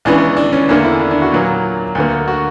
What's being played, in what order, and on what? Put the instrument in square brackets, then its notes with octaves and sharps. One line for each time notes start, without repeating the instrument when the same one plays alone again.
[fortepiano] C#2 C#3 E3 B3 D4
D4
C#4
E2 D3 A#3 D4
E4
D4
D4
F#4
A#2 F#3 A#3
D2 D3 A#3
F#4